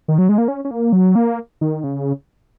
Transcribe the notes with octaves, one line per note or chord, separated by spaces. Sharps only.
D#3
F#3
G#3
A#3
C#4
C#4
A#3
F#3
A#3
D#3
C#3